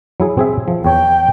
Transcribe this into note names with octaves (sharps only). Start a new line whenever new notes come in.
F#3 E4 G#4
C4 G#4 E5
F3
E2 C#5 G5 A5